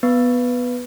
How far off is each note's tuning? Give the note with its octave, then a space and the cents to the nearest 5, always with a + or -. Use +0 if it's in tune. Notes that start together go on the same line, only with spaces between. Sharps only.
B3 +0 B4 +0